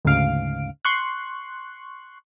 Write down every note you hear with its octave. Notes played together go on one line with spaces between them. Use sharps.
D2 G#2 C#3 F5 D7
C6 C#6 F#6